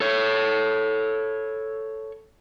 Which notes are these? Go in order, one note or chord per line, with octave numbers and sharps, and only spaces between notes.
A4 C#5